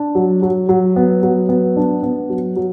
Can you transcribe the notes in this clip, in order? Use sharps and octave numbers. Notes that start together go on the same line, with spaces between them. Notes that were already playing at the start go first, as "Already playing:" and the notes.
Already playing: D4
F#3
F#3
F#3
B3
F#3
B3
D4
B3
F#3
F#3